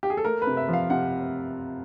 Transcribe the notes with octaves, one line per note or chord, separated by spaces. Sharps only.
G4
G#4
A4
A3 A#4
B4
C3
E5
F3
F5
C3 F#5